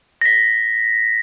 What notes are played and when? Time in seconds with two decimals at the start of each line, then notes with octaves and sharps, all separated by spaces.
0.21 A#6 B6